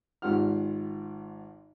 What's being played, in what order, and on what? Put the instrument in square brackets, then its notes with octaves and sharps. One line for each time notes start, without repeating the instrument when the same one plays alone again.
[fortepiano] G#1 F4 G4 F#5 F6